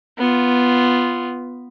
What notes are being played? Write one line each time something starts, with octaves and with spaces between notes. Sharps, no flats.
B3 F4